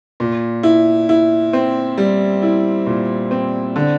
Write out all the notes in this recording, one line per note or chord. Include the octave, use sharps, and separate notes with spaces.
A#2
E4
E4
C4
G3
E4
A#2
C4
D3